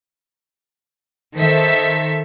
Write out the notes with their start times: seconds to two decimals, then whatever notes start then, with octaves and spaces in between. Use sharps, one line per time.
1.36 D#3 A4 C5 E5 B6